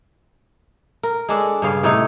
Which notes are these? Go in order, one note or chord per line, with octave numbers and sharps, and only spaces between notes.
A#4
G#3 D4 A4
G2 C#3 F5
A2 C3 D#4 C#5